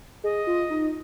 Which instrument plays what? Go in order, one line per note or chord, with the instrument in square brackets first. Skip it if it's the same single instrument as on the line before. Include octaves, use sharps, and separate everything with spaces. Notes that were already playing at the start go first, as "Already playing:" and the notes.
[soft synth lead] G#4 [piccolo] D#5
[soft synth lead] F4
D#4